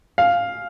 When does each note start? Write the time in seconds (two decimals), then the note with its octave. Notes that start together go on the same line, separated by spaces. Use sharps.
0.18 F5